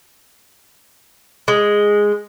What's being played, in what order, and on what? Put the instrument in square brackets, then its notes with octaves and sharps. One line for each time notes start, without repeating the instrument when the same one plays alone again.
[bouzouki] G#3